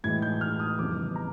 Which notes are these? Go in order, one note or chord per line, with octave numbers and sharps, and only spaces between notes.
A2 E3 G#3 G#6
G6
F6
D#6
F2 C#3 E3 G3 B3 D6
A#5